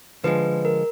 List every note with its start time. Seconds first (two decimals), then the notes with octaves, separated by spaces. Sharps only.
0.24 D3 F3 G#3 B4
0.65 A#4